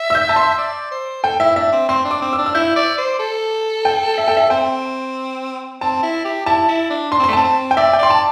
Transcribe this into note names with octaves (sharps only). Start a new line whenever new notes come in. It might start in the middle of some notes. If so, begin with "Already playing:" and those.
Already playing: E5
E6
G6
A5
C6
D5
C5
A4 G5
E4 E5
D4 E5
C4
C4 C6
D4
D6
C4
E6
D4
E6
E4 G6
D5
C5
A4
G5
E5
G5
E5
C4 G5
C4 A5
E4
G4
E4 A5
E4
D4
D4 C6
C4
A3 C6
C4 A5
C4
G5
D5 E5
G5
D5 C6
A5